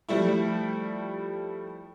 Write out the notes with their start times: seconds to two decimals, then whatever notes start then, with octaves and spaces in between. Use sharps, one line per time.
0.09 F3 G3 A3 E4